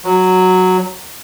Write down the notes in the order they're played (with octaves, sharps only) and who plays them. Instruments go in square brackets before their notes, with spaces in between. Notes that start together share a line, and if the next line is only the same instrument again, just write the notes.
[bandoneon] F#3